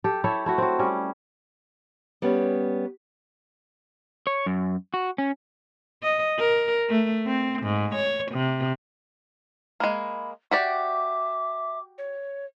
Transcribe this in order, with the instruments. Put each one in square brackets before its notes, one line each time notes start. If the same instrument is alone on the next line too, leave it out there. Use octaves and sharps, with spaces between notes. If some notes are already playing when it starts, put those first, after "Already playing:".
[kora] G4 A4
E4 A4 C#5 E5
A3 E4 F#4
C4 F#4
G3 C#4
[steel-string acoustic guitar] G3 B3 C#4
[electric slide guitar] C#5
F#2
F#4
C#4
[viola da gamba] D#5
A#4
A3
C4
G#2
C#5
C3
[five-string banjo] G#3 A#3 [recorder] B5
[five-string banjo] F#4 G4 D5 [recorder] E5 [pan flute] D6
[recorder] C#5